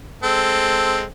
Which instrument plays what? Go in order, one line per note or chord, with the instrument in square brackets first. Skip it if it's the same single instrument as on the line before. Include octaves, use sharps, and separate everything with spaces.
[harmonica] G#3 C4 A4